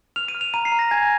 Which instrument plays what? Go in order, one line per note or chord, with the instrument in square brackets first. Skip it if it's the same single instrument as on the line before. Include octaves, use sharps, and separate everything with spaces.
[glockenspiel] F6 F7
D#7
F6
F7
A#5 D#7
C7
A#5
A#6
G#5 G#6